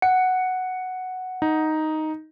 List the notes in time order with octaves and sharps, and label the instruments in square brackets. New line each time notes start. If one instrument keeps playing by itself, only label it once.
[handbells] F#5 [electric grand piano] C#7
[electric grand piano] D#4